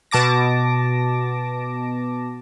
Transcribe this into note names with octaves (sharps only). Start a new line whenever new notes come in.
B2 A5 D6 A#6